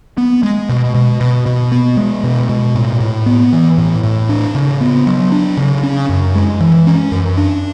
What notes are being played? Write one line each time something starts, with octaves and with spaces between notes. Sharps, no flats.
B3
G#3
B2
B2
B2
B2
B3
G#3
B2
B2
A2
A2
B3
E3
A2
A2
D4
C#3
B3
F#3
D4
C#3
C#4
F#2
G#3
E3
C#4
F#2
D4